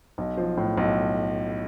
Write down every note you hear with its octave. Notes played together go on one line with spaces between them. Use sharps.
B1
F3
A2
B1